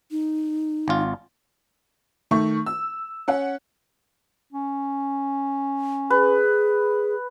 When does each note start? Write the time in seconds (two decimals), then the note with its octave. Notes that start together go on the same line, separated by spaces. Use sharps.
0.11 D#4
0.88 G#1 F4
2.31 D#3 A3 C#6
2.66 E6
3.28 C#4 F#5
4.52 C#4
6.10 G#4 B4